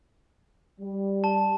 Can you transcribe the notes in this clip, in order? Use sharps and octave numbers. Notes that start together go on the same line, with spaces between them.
G3
A5